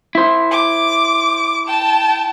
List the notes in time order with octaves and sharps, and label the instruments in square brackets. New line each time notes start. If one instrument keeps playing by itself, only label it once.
[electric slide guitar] E4 C5
[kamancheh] D6
G5 A5